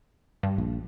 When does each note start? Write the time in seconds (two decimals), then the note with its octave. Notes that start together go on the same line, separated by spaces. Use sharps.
0.43 G2
0.58 A#1